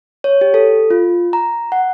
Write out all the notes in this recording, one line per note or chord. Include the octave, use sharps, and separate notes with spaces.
C#5
G4
A4
F4
A#5
F#5